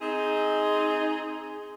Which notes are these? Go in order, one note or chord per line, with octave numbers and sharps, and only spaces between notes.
C4 D#4 G#4